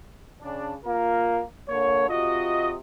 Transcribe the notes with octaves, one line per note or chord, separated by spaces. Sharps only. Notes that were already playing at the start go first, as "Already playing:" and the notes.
C#3 D4
A#3 F4 A#4
D3 A#3 C#5
C3 F4 F#4 D#5